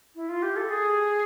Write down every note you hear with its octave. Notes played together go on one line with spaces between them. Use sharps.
E4
F4
G4
A4
G#4